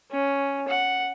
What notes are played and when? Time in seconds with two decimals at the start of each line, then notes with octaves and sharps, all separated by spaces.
0.11 C#4
0.68 F#5